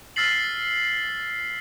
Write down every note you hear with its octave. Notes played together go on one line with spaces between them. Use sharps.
E6 F6 A6 B6 C7 F#7